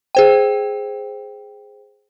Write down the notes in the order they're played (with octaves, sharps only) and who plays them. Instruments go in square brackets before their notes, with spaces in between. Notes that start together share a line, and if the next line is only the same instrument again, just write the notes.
[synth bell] G#4 C5 G5